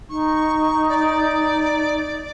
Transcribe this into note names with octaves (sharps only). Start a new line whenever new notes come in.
D#4 C#6
D5